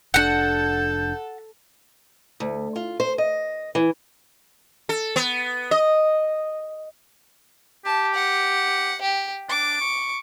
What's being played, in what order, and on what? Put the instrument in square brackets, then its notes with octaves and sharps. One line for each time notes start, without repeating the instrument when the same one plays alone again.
[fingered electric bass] F1 B2 D4 [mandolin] F#4 F#5 [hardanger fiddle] A4 A5 [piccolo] G6
[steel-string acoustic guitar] D2
F4
C5
D#5
E3
[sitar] A4
B3
D#5
[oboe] G4 [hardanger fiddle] A5
[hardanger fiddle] F#5
G4
[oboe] D4 [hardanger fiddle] D6
[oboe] C#6